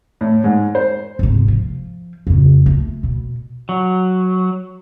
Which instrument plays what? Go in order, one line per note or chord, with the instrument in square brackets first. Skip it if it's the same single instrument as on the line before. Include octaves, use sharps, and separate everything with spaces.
[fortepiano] A2
G#2
C5
[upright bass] G#2 C3
F3
F2 C#3
A3
B2
[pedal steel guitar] F#3